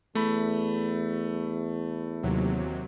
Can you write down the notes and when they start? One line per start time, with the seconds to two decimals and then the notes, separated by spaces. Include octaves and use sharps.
0.15 E2 A3 B5
2.23 D#2 C3 F#3